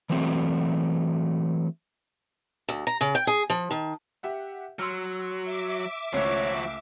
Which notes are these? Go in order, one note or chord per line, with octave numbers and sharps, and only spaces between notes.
E3 F#3 A3 C4 E4 F#4
D2
A#5
C#3
G5
G#4
F3
D#3
G4 E5 F#5
F#3 C6 E6 F6
E5 D6
C#2 F3 A3 F#4 C#5